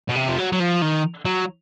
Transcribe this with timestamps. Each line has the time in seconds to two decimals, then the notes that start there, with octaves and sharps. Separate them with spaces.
0.09 B2
0.15 C3
0.28 F3
0.38 F#3
0.52 F#3
0.60 F3
0.82 D#3
1.26 F#3